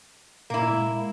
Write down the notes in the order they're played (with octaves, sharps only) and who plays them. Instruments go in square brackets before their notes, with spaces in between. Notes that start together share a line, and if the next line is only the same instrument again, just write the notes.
[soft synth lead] A#2 [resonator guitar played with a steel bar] A#3 E4
[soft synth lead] G#3